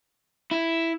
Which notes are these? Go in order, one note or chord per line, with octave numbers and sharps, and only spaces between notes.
E4